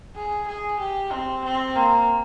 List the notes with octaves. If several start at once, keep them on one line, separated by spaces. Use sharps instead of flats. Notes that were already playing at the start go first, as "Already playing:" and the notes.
G#4
G#4
G4
C4
C4
A#3